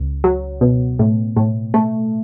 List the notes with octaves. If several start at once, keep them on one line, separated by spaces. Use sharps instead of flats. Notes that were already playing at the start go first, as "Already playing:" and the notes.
Already playing: C#2
F#3
B2
A2
A2
A3